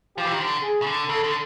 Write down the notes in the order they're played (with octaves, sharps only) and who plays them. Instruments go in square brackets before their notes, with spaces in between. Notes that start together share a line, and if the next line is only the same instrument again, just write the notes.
[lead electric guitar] F3 [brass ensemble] G4
[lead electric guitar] E3
D#3
D3
[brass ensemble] G#4
[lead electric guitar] C#3
D3
[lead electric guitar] C#3 [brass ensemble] A4
[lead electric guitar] D3